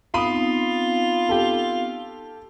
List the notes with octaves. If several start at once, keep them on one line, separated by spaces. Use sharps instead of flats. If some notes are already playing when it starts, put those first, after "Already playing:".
B3 C4 D#4 F4 B5 D#6
G4 A4